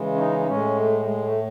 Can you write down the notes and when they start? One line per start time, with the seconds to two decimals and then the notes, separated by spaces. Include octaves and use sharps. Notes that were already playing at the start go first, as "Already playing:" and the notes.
Already playing: C#3 E3 G#3
0.14 C#4
0.18 D#4
0.39 D#4
0.47 A2 G#3 C#4
0.76 A3
0.99 A3
1.05 G#3
1.24 A3